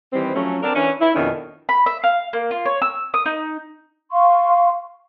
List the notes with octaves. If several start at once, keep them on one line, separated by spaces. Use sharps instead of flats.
D#3 E3 G3 C4
F3 F#3 A3 C#4
C4 D4 A#4
E3 C#4 D4
E4
F2 B2 D#3 C#4 D4 E4
B5
E5
F5
A#3
F4
C#5
E6
D#6
D#4
F5 C6 C#6